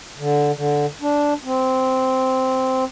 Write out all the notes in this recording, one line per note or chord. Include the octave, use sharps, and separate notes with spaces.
D3
D3
D4
C4